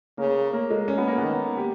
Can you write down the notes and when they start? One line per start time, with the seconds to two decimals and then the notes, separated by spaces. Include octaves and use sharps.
0.18 C#3 A#3
0.53 A#3
0.70 G#3
0.88 C#4
0.98 B3
1.08 A#3
1.18 D#3 B3
1.57 G4